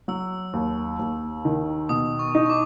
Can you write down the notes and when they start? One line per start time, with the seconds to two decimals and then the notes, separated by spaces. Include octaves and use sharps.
0.08 F#3 E6
0.53 D#2
0.99 D#2
1.45 D#3
1.89 B2 D#6
2.19 C#6
2.35 D#4
2.46 C#6
2.50 D6